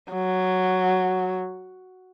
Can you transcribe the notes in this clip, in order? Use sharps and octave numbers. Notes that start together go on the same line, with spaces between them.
F#3